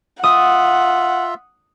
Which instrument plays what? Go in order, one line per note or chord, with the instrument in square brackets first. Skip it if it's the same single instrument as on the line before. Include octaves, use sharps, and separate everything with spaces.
[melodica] F4 E5 [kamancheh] F#5 [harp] D#6